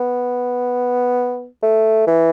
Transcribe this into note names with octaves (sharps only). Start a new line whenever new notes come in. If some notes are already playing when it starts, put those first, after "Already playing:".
Already playing: B3
A3
E3